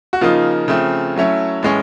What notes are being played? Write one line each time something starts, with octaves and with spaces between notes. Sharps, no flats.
F#4
C#3 F3 A#3 D#4 F4
C#3 F3 A3 C4
F#3 A3 C#4 E4
A2 E3 G#3 C#4